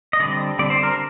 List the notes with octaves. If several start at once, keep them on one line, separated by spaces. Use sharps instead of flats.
D#5
D3 G3 C4 D5
D3 G3 C4 D5
C5
A#4